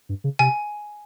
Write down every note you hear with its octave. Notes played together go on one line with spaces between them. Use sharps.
G2
C#3
C3 G#5